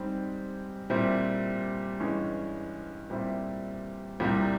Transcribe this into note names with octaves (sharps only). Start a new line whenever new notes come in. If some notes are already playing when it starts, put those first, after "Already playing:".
Already playing: G#2 G3 C4
A#2 G3 C4 E4
G2 E3 G#3 C#4
A#2 G3 C4 E4
C2 A#2 G3